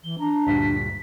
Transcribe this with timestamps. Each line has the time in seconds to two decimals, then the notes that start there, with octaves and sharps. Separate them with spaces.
0.03 E3 G7
0.18 D4 A#5
0.47 D2 G2 A#2 B6